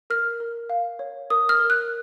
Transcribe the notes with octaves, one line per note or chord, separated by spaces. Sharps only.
A#4 F6
A#4
F5
C#5
A#4 D#6
F6
A#4
F#6